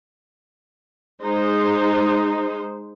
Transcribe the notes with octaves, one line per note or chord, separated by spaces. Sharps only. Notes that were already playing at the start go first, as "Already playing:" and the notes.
G#3 D#4 C5